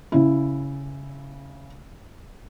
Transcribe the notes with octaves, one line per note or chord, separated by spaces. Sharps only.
C#3 E4